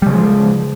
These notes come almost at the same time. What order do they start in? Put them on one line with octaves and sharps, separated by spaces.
G3 C#3 G#3 F3